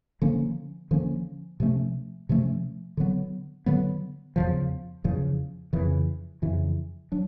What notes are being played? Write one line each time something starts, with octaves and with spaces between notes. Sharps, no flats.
D3 F3 A#3 C#4
D3 F3 A#3 C#4
C3 F3 A3 C#4
C3 F3 A3 C#4
D3 F#3 B3
D3 F#3 B3
E2 C#3 F3
E2 C#3 F3
F2 C#3 E3
F2 C#3 E3
F#3 D4